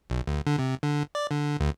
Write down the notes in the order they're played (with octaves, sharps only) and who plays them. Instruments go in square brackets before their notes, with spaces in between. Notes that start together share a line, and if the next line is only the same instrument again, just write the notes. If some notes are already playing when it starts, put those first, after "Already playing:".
[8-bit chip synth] B1
D2
D3
C3
D3
D5
D3
D2